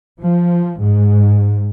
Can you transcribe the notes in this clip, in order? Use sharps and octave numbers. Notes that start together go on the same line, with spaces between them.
F3
G#2